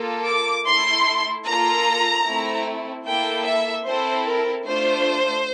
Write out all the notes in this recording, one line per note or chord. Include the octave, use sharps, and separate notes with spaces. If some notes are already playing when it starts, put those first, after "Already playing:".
Already playing: A#3 F4 A4
D6
A3 E4 A4 C6
A#3 F4 A4 A#5
A3 C4 E4
A#3 E4 A4 G5
E5
C4 E4 A4 C5
A#4
A3 D4 F4 C5